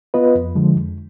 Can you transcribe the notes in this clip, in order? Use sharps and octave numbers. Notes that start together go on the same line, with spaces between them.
B3 F4 B4 D#5
F2
D3 F3 G#3
F2